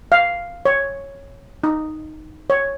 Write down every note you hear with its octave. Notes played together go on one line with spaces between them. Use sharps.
F5
C#5
D#4
C#5